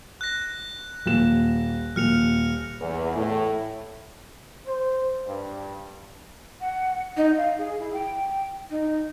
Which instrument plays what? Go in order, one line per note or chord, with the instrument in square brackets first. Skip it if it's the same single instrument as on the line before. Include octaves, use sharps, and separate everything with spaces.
[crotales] F#6 A#6
[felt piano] D#1 E7
[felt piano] D#1 [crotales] F6 C#7 F7
[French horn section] E2
A2
[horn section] C5
G2
[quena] F#5
D#4
F5
G#4
E4
G5
D#4